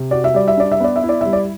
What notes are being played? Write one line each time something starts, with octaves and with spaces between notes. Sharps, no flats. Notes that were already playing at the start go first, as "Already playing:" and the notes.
Already playing: C3
F#4 D5
E5
G3 D5
E5
D4 D5
E5
B3 D5
E5
E4
D5
G3 E5
D5